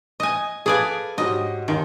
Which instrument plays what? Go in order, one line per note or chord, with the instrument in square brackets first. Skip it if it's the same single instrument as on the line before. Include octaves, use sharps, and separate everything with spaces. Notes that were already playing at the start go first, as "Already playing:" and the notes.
[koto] D#5 G#5
[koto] G#4 D5 G#5 [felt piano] A4 B4 F5
[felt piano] G#2 F#3 G4 [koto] D#5
[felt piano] G1 D#2 D7 [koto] D#3